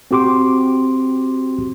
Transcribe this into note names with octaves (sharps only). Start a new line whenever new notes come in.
C4 F#4 G4 C6 D6